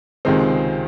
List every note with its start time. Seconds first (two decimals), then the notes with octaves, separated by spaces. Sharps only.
0.25 C#2 C3 D#3 G#3 C4